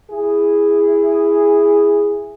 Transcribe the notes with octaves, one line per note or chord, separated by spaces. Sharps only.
E4 G#4